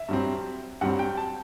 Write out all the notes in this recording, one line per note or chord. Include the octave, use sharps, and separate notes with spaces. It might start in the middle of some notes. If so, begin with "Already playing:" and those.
Already playing: E5
G2 F#3 C4
G2 F#3 C4 F#5
G5
A5